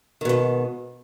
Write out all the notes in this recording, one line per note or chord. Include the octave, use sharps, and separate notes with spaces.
G#2 B2 D#3